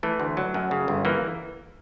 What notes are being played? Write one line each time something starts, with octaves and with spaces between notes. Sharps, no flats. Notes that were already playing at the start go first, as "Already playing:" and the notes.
E3 A3
D2
F#3
F#2
C#3
G1
E3 A#3